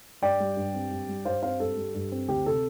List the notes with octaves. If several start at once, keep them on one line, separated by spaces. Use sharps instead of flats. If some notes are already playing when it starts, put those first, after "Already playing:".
G2 D5 G5
G3
G2
C4
G2
G3
G2 C5 F5
C4 C5 F5
G2 A4
G3
G2
C4
D2 G4
C3 A4